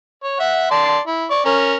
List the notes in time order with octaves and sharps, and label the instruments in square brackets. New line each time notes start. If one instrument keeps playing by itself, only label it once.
[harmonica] C#5
E5 F#5
D5 A5 C6
E4
D5 C#6
C#4 A#4